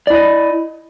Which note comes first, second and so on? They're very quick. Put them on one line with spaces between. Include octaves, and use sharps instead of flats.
D5 E4 D#5